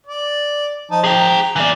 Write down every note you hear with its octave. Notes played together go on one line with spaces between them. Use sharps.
D5
F3 D#4 A5
G#4 G5 A#5
E3 D5